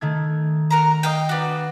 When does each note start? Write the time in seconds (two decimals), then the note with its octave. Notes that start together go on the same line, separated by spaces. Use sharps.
0.01 D#3 A3 G#6
0.71 F#4 A#4 A#5
1.03 D#5 F5 G5
1.29 D4 F#4 B4 F#5